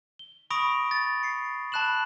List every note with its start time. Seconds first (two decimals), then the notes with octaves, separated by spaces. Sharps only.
0.19 G7
0.50 B5 C#6 D#6 A#6 D7 F7
0.91 A6
1.23 C7 C#7
1.72 A5 B5 F#6 E7 F#7